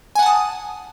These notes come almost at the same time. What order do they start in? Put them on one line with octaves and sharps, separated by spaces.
G#5 F#5 A5 D#6